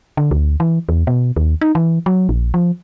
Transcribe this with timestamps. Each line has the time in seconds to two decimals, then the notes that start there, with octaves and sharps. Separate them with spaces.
0.17 D3
0.31 D2
0.60 E3
0.89 E2
1.07 B2
1.36 D#2
1.61 D#4
1.75 E3
2.06 F#3
2.29 A#1
2.54 F3